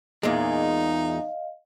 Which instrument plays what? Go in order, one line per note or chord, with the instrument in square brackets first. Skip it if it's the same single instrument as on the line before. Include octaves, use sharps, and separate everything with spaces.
[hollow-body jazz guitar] E2 A#2 G#3 [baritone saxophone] D#4 [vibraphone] D#5 F5